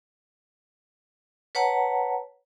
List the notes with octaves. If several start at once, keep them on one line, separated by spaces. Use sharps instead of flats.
B4 C#5 F#5 A5 A#5